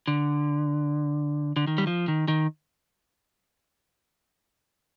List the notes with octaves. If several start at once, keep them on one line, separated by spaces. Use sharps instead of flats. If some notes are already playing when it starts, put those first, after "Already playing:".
D3
D3
D#3
G3
F3
D#3
D#3